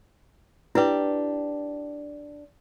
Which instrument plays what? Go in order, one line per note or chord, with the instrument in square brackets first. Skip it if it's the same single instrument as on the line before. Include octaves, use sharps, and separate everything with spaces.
[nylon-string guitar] D4 G4 [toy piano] E4 B4